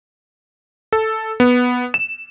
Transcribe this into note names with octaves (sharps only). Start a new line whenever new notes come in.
A4
B3
E7